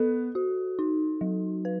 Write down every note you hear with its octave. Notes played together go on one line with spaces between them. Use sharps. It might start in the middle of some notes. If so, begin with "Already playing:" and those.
Already playing: B3 A4
F#4
D#4
F#3
B4